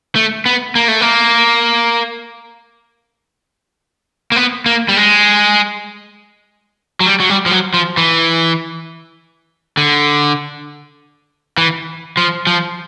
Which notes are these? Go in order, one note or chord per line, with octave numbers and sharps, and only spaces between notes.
A3
B3
A#3
A3
A#3
A#3
B3
A#3
G3
G#3
F#3
G3
F#3
G3
F3
F#3
F3
E3
D3
E3
F3
F3